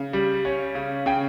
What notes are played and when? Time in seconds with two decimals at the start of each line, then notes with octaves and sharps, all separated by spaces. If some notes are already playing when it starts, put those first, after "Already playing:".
Already playing: C#3
0.13 G3
0.45 C#4
0.75 C#3
1.06 C#3 G5